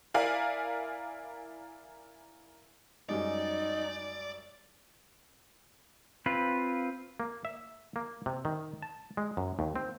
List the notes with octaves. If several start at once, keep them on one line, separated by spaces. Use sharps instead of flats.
E4 A#4 D5 F5 G#5
F#2 G3 G#3 D#4 D5
C4 F4 B4
A#3
E5
A#3
C3
D#3
A5
G#3
F#2
D#2
C4